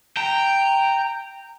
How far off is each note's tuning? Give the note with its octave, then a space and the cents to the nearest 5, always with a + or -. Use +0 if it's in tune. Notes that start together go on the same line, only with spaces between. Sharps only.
G5 +0 A#5 -15